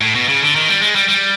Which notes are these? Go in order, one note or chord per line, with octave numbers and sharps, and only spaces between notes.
A2
B2
C#3
D3
D#3
G3
G#3
G3
G3